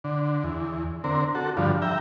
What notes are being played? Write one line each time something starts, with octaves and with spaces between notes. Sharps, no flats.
D3
E2
D3 C4 A#4
F#4 A4
G2 D3 F3
E5 G5 A#5